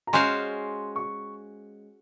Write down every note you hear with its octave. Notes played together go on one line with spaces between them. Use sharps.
A#5
G#3 C#4 F#4 C5 F5 C6
C#6